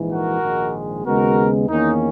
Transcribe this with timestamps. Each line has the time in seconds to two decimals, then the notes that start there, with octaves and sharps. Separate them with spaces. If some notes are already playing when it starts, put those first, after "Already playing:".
Already playing: A#1 G#2 E3
0.10 F#4 A#4
0.42 A#1 G#2 D#3 G#3
1.04 D#2 C#3 G#3 B3 F#4 A#4
1.68 E2 D#3 A#3 C#4 D#4